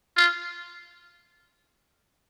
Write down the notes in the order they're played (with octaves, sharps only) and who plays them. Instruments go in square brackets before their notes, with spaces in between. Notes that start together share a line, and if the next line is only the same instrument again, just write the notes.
[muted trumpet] F4